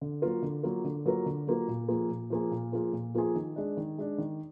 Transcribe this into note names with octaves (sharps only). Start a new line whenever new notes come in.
D3
F#3 A#3 F4 A#4
D3
F#3 A#3 F4 A#4
D3
F#3 A#3 F4 A#4
D3
F#3 A#3 F4 A#4
A#2
F3 A#3 F4 G#4
A#2
F3 A#3 F4 G#4
A#2
F3 A#3 F4 G#4
A#2
F3 A#3 F4 G#4
D#3
G#3 D4
D#3
G#3 D4
D#3